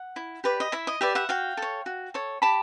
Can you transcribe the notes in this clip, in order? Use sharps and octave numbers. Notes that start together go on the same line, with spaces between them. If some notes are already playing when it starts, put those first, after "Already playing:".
Already playing: F#5
E4
G4 B4 D5
D#5
E4 E5
D#5
G4 B4 D5 E5
E5 F#5
F#4 F5 G5
A4 C#5
F#4
A4 C#5
G4 A5 B5